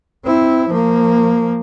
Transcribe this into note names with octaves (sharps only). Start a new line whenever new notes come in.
C4 E4
F3 A#3